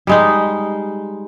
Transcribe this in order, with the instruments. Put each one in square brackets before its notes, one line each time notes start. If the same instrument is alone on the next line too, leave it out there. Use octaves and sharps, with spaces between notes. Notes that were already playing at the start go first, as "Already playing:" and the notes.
[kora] G3 G#3 D#4